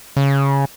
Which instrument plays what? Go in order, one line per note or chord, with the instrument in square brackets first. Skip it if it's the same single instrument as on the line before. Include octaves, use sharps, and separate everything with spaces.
[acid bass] C#3